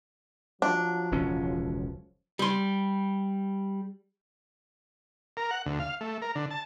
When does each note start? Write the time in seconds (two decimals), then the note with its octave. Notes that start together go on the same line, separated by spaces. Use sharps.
0.62 F3 F#3 D4
1.12 E1 C#2 C#4
2.39 G3 C6
5.37 A#4
5.51 F#5
5.66 D2
5.79 F5
6.01 A3
6.22 A#4
6.35 D3
6.51 A5